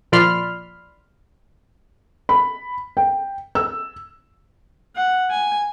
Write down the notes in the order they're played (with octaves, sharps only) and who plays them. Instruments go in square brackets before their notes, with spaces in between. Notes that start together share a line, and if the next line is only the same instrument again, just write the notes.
[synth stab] A#2 F3 D5 B5 C6 F6
[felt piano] B5
G5
E6
[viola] F#5
G#5